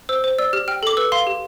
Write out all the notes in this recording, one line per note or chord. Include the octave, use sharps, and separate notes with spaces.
C5 E6
C5
D5 E6
G4 F6
G5 F6
A4 D6
B4 E6
F5 C6
G4